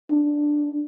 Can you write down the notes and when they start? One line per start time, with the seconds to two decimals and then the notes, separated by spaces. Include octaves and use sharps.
0.11 D4